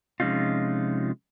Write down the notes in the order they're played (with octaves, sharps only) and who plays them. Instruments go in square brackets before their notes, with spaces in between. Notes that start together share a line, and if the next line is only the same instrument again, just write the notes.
[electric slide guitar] C3 F3 G#3 C#4 D#4 F4